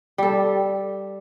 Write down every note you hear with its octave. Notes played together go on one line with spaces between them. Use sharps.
G3 A4